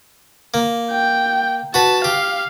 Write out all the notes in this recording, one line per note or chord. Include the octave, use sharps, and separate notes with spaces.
A#3
G5
F#4 B4 A5
G4 F5